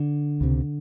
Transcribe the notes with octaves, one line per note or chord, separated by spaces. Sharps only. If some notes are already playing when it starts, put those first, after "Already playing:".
Already playing: D3
C#2 C3